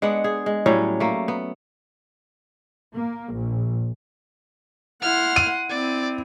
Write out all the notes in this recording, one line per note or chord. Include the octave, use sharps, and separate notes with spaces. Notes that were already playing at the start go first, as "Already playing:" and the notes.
G#3 B3 D4 F#5
G#4
G#3
A2 F#3 G3 C#4
A3 A#3
B3
A#3
A#1
E4 F#5 C6 F6
D#7
C4 E4 D5